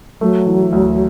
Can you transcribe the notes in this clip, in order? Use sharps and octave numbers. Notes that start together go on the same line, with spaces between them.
F#3 A3
E3
D2